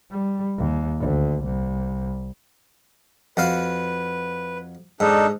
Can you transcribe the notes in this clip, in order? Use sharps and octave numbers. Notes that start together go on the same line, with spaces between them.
G3
D#2
D2
C2
F2 F#4 B4 F5
G#2 D4 D#4 A4